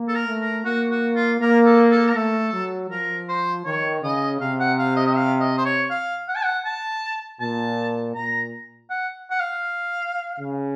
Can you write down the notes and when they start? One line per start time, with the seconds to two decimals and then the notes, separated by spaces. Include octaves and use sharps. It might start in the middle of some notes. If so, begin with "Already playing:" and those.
Already playing: A#3
0.08 A4
0.15 A#4
0.28 A3
0.41 A#4
0.65 A#3 F#4
0.90 F#4
1.15 F4
1.40 A#3 A#4
1.65 A4
1.90 A4
2.08 A#4
2.15 A3 A4
2.53 F#3
2.90 F3 A#4
3.29 C5
3.65 D#3 C#5
4.03 C#3 D#5
4.40 C3 F5
4.60 F#5
4.79 F5
4.96 D#5
5.06 D#5
5.16 F5
5.40 D#5
5.57 C5
5.65 C#5
5.90 F5
6.28 F#5
6.35 A5
6.44 F#5
6.65 A5
7.40 A#2 A5
8.15 A#2 A#5
8.90 F#5
9.30 F#5
9.40 F5
10.40 C#3